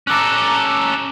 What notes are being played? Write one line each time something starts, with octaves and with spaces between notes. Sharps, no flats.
C#4 A4 A#5 D6 F#6